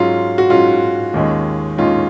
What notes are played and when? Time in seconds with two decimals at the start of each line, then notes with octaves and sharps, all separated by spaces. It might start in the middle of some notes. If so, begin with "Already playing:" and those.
Already playing: G#2 F#3 C#4 F4
0.38 F#4
0.50 G#2 F#3 C#4 F4
1.14 D#2 D#3 G#3 C#4
1.78 D#2 D#3 G#3 C#4 F4